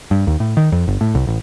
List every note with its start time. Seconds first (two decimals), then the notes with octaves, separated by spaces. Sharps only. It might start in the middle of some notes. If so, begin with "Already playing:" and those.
0.11 G2
0.27 D#2
0.40 A2
0.57 D#3
0.72 F2
0.87 G1
1.01 A2
1.15 C2
1.27 A1